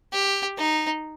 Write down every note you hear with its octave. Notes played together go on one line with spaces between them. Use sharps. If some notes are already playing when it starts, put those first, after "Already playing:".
G4
D#4